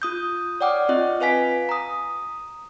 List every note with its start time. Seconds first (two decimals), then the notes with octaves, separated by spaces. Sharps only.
0.02 F4 D#6 G6
0.61 C#5 D5 F#5 G5 D6 F6
0.89 C4 F4 D#5
1.20 F4 B4 F5 G#5 B6
1.69 A#5 D#6